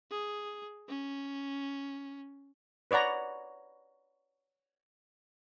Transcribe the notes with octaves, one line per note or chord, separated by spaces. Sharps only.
G#4
C#4
B4 C#5 D5 F#5 A#5